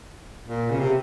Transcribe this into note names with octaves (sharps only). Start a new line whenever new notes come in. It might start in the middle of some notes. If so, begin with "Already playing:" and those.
A#2
C#3
C3